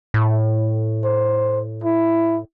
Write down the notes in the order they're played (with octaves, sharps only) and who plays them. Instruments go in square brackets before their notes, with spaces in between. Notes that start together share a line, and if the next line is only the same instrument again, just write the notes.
[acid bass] A2
[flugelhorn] C5
E4